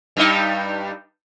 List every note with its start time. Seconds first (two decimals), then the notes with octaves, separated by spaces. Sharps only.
0.17 G2 G3 D#4